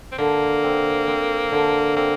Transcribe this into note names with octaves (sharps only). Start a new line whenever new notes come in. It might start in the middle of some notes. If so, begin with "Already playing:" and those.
C4
D3 A#3
C4
C4
D3
A#3 C4